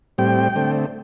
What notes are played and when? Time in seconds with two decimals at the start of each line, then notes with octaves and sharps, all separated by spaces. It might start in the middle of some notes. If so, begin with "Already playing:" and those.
0.18 A2 G3 C4 G5
0.56 D3 A3 C4